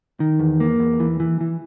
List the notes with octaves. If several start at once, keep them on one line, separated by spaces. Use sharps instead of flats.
D#3
E2
A#3
E2
E3
E3
E3